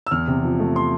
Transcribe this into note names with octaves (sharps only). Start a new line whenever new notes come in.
E6
E2 F6
C3
F3
A3
C6